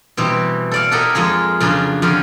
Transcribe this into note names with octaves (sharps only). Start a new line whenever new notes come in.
B2 E3 G3 C4
A4 D5 F5
E4 G4 A4 A#4 D#5 F#5
F2 G#3 F4 G#4
F2 C#3 F#3 D4 C6
F2 D3 G4 F5 G#5